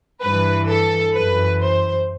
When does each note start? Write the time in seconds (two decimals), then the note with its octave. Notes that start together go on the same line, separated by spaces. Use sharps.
0.22 G2 B4
0.27 E3
0.69 A4
1.15 F#2 E3 B4
1.61 C5